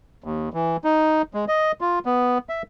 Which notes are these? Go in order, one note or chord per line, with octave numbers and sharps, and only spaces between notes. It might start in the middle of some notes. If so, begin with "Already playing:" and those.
D#2
E3
D#4
G#3
D#5
F4
B3
E5